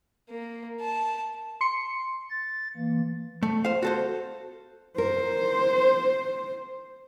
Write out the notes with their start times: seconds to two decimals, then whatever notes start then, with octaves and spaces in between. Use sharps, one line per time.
0.30 A#3
0.81 A5
1.61 C6 C#7
2.30 A6
2.77 E3 A#3
3.43 A3
3.65 C5 F5
3.83 F#4 A4 C5
4.98 A#4 C5